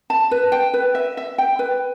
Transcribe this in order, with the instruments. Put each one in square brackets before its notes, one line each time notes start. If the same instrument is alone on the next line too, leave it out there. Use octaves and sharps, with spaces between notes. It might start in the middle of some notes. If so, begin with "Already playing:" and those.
[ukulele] A5
B4
G5
B4
E5
E5
G5
B4